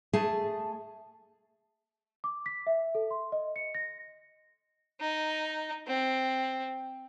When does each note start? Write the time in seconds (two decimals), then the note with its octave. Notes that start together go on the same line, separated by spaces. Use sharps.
0.13 A3 G#4 A5
2.24 D6
2.46 B6
2.67 E5
2.95 A4
3.11 C6
3.32 D#5
3.56 C#7
3.75 A#6
5.01 D#4
5.87 C4